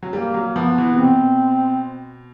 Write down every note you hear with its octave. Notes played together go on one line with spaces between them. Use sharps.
F#3
G3 A#3
F#3
F3 B3
E3
C3
B2 C4